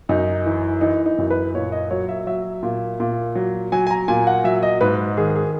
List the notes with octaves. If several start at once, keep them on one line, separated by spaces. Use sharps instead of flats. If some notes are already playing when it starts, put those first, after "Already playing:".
F#2 D#4
E3
E3 D#4
D#4
F#2
B4
A#2 C#5
D#5
F#3 C#5
E5
F#3 E5
A#2
A#2
F#3
F#3 G#5
G#5
A#5
A#2 G#5
F#5
F#3 E5
D#5
G#2 B4
D#3 G#4
G#4